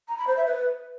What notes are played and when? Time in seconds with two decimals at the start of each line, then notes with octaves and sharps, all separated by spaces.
0.08 A#5
0.18 B5
0.27 C5
0.37 E5
0.46 B4